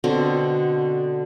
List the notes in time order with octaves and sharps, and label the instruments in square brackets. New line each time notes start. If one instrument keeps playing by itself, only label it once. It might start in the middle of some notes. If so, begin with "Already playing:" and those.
[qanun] B2 D3 C4 A#5